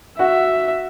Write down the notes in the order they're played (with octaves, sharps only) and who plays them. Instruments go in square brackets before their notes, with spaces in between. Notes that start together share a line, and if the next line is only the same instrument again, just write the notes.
[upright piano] F#4 [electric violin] E5